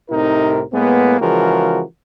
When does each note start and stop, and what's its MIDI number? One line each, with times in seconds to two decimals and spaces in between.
0.10 0.62 36
0.10 0.62 45
0.10 0.62 48
0.10 0.62 63
0.10 0.62 70
0.73 1.16 45
0.73 1.16 56
0.73 1.16 58
0.73 1.16 59
1.20 1.82 49
1.20 1.82 52
1.20 1.82 53
1.20 1.82 56
1.20 1.82 66
1.20 1.82 70